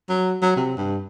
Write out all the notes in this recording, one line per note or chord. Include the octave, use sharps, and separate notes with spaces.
F#3
F#3
C3
G2